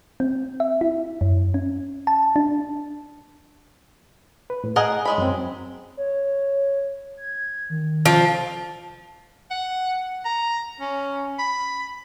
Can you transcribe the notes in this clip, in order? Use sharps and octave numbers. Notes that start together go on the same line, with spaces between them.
C4
E5
E4
F#2
C#4
A5
D4
B4
A2
G#4 A#4 D#5 F#5 G#5
F#3 G#3 B5
F#2 C4
C#5
G#6
D#3
F3
F#5
A#5
C#4
B5